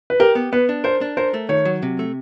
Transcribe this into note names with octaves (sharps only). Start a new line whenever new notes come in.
B4
G4 A#4
B3
B3 B4
D4
A#4 C5
D4
A#4 C5
A3
D#3 C#5
F#3
C3
A3